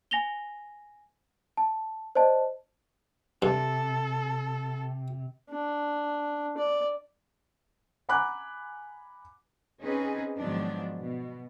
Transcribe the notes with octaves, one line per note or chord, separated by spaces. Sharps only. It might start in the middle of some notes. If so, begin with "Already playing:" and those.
G#5 A#6 F7 G7
A5
C5 D5 D#5 A5
G2 C3 A4
D4
D5
F#5 G#5 A#5 B5 D6 F#6
C4 C#4 D#4 G#4 B4
G#2 D#3 F3 F#3 B3 D4
B2